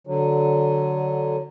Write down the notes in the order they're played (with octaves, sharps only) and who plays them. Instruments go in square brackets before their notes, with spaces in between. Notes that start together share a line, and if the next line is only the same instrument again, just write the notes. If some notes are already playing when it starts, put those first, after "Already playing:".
[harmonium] D3 F#3